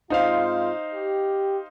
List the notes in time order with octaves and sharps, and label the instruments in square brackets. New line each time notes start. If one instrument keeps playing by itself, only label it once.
[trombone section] G#2 C4 F4 [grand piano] D#4 C5 F5
[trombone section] G4